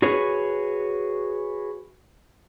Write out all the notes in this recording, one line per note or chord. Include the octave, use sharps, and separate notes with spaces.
F#4 G#4 B4 C#5